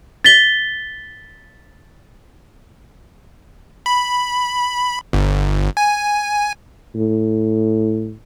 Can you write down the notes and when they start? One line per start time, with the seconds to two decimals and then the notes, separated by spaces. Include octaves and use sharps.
0.24 A6 B6 G7
3.86 B5
5.13 G1
5.77 G#5
6.95 A2